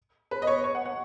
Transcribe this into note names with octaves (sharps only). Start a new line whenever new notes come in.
B4
D#5
C#5
C#5
F#5
F#5